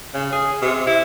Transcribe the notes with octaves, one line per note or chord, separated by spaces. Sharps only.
C#3
G#4
C3
E4